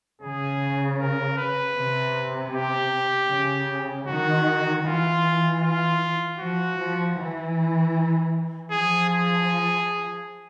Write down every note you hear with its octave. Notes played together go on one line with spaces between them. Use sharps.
C#3 G#4
A#4
B4
C3
G4
C#3
D#3 F#4
E3 F4
F4
F3 F#4
F3
E3
F3 G#4
G#4